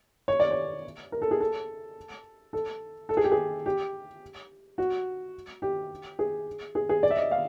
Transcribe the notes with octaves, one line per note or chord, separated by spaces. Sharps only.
C#5
D5
C#5
A#4
A4
G#4
A4
A4
A4
G#4
G4
G#4
G4
F#4
G4
G#4
G#4
G#4
D5
E5
D#5
F5